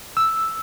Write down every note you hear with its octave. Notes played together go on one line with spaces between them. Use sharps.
E6